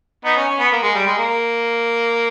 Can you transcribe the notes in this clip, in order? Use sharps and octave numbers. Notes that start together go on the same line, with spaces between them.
B3 D#4
C#4
C#4
B3
A#3
G#3
G3
G#3
A#3